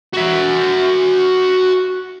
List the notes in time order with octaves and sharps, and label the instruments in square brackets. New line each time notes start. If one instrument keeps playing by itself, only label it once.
[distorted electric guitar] F#4 E5